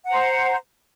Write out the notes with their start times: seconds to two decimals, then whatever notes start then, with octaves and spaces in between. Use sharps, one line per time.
0.05 F#5
0.08 A#5
0.10 C5